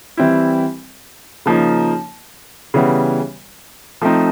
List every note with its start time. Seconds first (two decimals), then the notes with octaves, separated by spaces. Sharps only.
0.17 E3 G3 C4 E4
1.46 C#3 F3 A#3 D#4
2.74 C#3 E3 G3 B3
4.02 F3 A3 C4 D#4